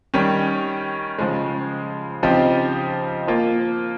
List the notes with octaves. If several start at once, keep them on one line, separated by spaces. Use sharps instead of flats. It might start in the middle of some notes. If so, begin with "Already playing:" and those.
D#3 G3 C#4
C#3 F3 G#3
C#3 F3 C4 D#4 G4
F3 A#3 F4